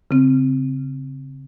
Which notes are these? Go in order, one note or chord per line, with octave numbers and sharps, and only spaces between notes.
C#3 C4